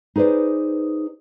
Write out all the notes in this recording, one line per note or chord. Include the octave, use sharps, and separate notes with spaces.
D#4 G#4 B4 C5 D5